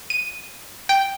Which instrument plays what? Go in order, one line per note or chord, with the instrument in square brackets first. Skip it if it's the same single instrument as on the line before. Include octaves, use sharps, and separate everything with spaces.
[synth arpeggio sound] D#7
G5